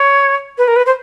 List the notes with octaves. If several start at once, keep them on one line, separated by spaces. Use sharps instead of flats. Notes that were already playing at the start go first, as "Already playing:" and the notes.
Already playing: C#5
B4
A#4
B4
C5